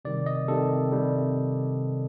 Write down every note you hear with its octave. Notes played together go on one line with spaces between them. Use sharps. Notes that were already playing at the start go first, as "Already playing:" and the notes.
C3 D#3 G3 D5
D#5
C3 D#3 G3 A4
C3 D#3 G3